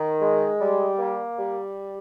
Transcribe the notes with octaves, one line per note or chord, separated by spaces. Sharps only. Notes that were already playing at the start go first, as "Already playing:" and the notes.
Already playing: D#3
G#3
G3
A#3
G3